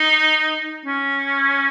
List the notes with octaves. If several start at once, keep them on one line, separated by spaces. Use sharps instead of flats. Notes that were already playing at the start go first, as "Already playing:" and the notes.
Already playing: D#4
C#4